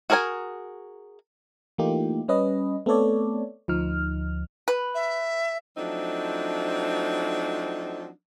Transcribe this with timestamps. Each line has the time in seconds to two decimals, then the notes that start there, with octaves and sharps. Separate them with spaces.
0.10 F#4 G#4 A#4 C#5 G#5
1.78 E3 A3 A#3 D#4 F4 G4
2.28 G3 C#4 B4 D#5
2.86 A3 B3 C4 A4 C#5 D5
3.68 D2 F3 D#4 F6
4.68 B4
4.95 E5
5.77 F3 F#3 A3 C4 D4 D#4